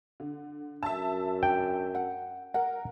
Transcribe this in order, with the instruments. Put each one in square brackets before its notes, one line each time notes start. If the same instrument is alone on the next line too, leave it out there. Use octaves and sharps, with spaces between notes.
[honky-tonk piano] D3
[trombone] F#2 [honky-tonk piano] E5 A5
[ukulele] D4 [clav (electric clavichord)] G5
[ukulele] F#5
[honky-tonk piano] A#4 [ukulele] F#5